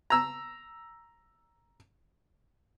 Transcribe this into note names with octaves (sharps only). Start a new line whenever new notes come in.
A#5 E6